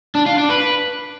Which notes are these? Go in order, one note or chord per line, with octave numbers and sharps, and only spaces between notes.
D4
F4
D4
B4